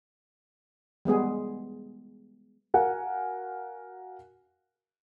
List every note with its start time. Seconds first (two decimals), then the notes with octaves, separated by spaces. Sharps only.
1.05 G3 G#3 B3 G#4
2.74 F#4 A#4 F5 F#5 G#5